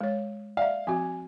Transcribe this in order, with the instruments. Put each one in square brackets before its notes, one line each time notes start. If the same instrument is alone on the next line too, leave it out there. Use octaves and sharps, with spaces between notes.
[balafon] G#3 C#5
[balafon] D5 E5 [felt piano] F5
[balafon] F3 C4 F#4 [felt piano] G#5